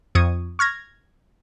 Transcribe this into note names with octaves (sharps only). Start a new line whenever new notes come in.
F2 C#6 D#6 G#6
C#6 F6 G#6 A#6